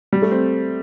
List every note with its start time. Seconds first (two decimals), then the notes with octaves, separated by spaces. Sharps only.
0.12 G3
0.22 A3
0.32 C4